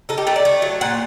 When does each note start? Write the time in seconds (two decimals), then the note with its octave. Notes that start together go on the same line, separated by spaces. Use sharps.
0.09 D#4 A4
0.18 G4
0.27 A3 A#4
0.36 D5
0.45 A3
0.62 F#3
0.81 A#2 F#5